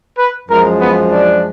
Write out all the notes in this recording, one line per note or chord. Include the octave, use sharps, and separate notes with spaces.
B4
F#2 F3 G#3 A#4
B3
D4